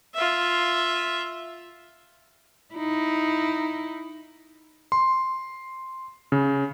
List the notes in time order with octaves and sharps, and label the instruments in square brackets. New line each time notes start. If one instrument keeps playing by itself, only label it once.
[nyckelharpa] F4 E5
[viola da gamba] D#4 E4
[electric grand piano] C6
C#3